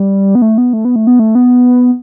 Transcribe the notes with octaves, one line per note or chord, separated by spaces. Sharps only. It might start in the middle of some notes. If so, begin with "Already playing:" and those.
Already playing: G3
B3
A3
B3
A3
B3
A3
B3
A3
B3